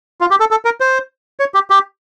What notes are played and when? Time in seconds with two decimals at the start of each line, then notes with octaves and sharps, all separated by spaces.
0.21 F4
0.31 G4
0.40 A4
0.51 A4
0.65 A#4
0.80 C5
1.40 C#5
1.54 G4
1.70 G4